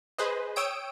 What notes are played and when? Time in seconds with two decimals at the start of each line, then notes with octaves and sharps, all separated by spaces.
0.18 G#4 B4 C5 D#5
0.56 C#5 G5 D#6 E6 D7